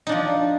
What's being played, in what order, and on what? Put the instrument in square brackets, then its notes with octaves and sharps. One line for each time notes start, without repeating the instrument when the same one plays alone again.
[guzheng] D#4
D4
F3